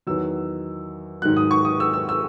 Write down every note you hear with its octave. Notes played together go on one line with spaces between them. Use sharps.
E2 D#3 F#3 E6
G#2 D#3 F#3 F#6
D#6
C#6
D#6
E6
E6
E6